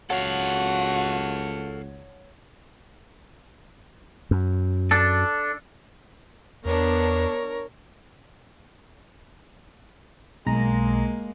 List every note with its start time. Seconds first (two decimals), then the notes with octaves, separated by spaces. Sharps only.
0.10 C#2 F#4 A4 C#5 F5 F#5
4.31 F#2
4.91 D4 A4
6.65 E2 B3 D4 A#4 C#5
10.47 B1 G#3 A#3 A#5